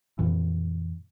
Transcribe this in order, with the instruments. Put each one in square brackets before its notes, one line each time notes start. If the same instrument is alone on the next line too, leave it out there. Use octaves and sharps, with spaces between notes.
[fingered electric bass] F2 A#2 E3